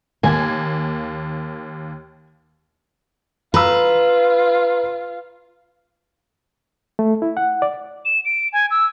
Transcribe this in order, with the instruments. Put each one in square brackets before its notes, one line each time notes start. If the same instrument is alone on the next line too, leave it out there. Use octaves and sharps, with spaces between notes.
[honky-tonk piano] D#2 A#3 [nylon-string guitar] G#5
[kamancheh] F4 [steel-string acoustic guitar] B4 [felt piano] A#5 B5 E6
[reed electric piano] A3
E4
F#5
D5
[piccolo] E7
D7
G#5
E6